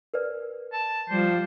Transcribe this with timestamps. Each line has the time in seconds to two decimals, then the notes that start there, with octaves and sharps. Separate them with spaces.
0.14 A#4 B4 D5
0.73 A5
1.10 F3 G3 C5